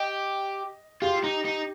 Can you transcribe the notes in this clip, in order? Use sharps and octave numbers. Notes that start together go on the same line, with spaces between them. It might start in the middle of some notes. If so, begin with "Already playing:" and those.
Already playing: G4 D#5
F4 G4
D#4
D#4